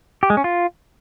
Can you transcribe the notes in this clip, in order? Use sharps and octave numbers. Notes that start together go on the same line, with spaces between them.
G4
G#3
C#4
F4